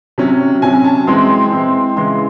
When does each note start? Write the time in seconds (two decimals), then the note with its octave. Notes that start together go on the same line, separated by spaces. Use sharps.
0.18 C3 F#3 C#4
0.62 C3 F#3 C#4 G#5
0.84 A5
1.07 E3 G#3 C4 C6
1.52 E3 G#3 C4
1.96 C#3 E3 G#3 C6